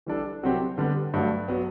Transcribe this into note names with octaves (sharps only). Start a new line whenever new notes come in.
E3 G3 D4 A4
C2 C3 F#3 C4 G4
D3 G3 B3
G2 F#3 A3
F#3 B3